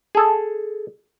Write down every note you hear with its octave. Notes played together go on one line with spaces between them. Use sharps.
G#4 A4